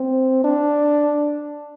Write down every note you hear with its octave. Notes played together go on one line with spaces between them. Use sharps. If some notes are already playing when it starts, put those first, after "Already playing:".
Already playing: C4
D4